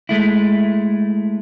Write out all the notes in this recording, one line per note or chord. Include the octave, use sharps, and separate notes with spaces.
G#3 A3 E4